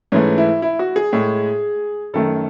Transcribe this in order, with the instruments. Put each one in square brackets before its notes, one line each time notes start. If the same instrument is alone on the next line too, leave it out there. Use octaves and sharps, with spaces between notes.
[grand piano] G#2 E3 A3 C#4
E4
E4
F#4
G#4
A2 G#3
F#2 D#3 A3 A4